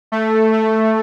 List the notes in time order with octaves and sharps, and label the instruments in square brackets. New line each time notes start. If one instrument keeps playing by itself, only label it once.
[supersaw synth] A3
A3